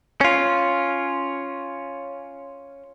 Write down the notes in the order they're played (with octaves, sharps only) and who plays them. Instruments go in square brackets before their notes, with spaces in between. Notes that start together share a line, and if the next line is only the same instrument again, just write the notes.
[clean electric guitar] C#4 F4